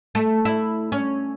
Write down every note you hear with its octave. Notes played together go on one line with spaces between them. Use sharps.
A3
E4
C#4